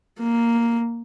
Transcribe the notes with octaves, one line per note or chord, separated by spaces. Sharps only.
A#3